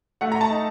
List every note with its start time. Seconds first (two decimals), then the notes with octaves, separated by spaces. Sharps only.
0.21 A3 F#5
0.32 A#5
0.41 A5
0.50 D#4